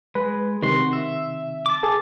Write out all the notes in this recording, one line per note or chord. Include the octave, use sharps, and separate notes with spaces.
G#3 B4
C3 D#3 F#4 C6
E5
A5 D6
G#4 A4